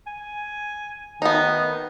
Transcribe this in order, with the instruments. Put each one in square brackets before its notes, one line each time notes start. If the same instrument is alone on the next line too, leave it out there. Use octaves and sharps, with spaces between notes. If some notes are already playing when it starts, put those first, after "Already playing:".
[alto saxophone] G#5
[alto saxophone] D#3 [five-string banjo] B3 D#4